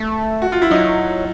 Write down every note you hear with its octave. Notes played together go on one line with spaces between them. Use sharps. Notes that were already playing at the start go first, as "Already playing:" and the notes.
Already playing: A3
F#4
F4
E4
F#3 D#4